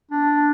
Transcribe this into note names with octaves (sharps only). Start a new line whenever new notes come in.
D4